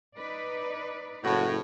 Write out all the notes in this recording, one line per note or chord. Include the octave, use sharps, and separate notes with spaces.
D#4 B4 D5
F#1 A2 F#4